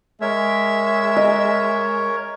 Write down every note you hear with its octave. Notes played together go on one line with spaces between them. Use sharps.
G#3 A#4 C#5 E5
D#5